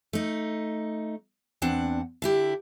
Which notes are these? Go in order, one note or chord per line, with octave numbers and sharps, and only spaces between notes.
A3 D#4
E2 C4 D4 F#5
D3 E4 G4